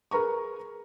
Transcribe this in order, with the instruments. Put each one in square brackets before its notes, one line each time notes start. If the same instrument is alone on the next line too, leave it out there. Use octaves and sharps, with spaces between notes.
[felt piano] G#4 A#4 B4 A#5 C#6